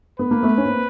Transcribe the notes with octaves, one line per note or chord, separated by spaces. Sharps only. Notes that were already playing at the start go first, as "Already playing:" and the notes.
B3 B4
A#3
A3 B3
C#4
A#3 C4